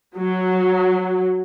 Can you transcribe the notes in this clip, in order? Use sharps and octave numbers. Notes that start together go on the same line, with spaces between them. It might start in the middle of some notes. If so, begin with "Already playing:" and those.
F#3